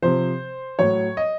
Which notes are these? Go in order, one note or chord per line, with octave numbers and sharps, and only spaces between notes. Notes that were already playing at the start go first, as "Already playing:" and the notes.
C3 F3 C5
A2 F#3 C#5
D#5